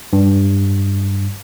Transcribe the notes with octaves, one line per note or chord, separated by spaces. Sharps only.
G2